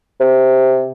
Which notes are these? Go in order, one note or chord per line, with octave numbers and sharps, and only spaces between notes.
C3